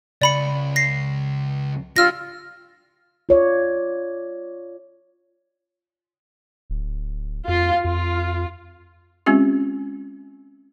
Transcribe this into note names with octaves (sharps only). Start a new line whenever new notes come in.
C#2 D5 B5 C#7
A#6 C7
D4 F4 G4 E6 F6 A#6
F4 C#5 D5
D1
F2 F4
F2 F4
G#3 C4 C#4 F4 G4